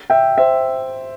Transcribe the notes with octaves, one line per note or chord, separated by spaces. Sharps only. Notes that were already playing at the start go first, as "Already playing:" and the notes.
E5 G5
C5 E5